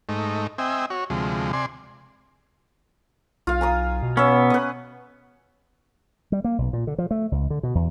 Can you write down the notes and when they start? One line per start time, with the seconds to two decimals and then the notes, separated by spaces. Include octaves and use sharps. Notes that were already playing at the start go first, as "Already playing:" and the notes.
0.09 G#2 A3 D#4
0.58 C4 D#5 E5 G5 G#5
0.90 F#4 C#5
1.10 D2 C3 F3 G#3
1.53 C3 D5 G#5 C6
3.47 B1 F4 F5
3.61 G#5 A#5 D#6
4.02 B2
4.17 B3 C#4 E5
4.50 B4 D#5
6.32 G3
6.44 A#3
6.58 B1
6.73 A#2
6.87 D3
6.98 F3
7.11 A3
7.32 C#2
7.50 D3
7.63 B2
7.75 E2